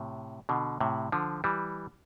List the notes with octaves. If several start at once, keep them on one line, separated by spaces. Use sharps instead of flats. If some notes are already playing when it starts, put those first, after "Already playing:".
Already playing: A2 C3
B2 D3
A2 C3
D3 F3
E3 G3